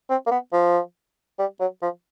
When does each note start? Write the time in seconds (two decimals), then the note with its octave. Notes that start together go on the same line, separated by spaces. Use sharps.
0.10 C4
0.26 A#3
0.31 B3
0.53 F3
1.39 G3
1.60 F#3
1.82 F3